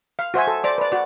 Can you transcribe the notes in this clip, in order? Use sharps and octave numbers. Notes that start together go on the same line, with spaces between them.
F5
F#4 C5 E5 G#5
A4
C5 D5 D6
B4 D5
F#4 D5